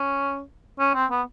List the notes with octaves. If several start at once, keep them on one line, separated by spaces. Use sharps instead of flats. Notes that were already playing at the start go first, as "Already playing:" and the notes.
Already playing: C#4
C#4
C4
B3